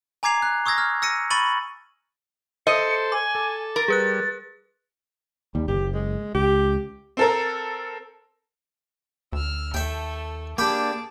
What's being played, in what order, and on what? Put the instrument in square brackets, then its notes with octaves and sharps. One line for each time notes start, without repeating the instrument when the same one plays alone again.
[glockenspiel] G#5 A#5 D6 G#6 C7 F7
F#6
C#6 D#6 E6 G#6 A#6
F6
E6 A#6 C#7 D#7
B5 C#6 A6 D#7 F#7
[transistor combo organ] A4 C5 [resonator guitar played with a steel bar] D#5 [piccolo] C#7
[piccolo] G#5 [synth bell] D6
[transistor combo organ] A4
[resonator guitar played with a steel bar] A#4 [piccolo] A6
[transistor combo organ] G3 [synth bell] G#4 B4 F#6
[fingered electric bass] D#2 [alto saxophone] G3
[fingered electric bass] F#1 [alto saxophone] G4
[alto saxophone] G#3
[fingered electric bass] C#2 [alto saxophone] G4
[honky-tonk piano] C4 A4 A#4
[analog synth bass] D2 [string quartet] E6 F6
[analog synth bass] D#2 [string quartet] A3 A4 [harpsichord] E5 G5
[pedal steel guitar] A#3 D4 [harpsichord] G4 G5 B5 [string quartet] G#4 A5 D6